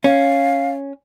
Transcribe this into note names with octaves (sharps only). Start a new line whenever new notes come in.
C#4 F5